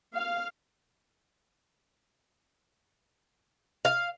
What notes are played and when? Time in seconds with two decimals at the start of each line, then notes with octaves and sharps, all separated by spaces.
0.13 F5
3.85 F5